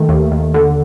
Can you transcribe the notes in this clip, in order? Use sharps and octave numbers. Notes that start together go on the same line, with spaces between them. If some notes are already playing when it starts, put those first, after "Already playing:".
Already playing: D#3 A3
D#2
D#2
D3